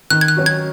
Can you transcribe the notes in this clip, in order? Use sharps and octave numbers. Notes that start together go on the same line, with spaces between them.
D#3 F#6
G#6
F#6
F#3 C#4 F#4
G#6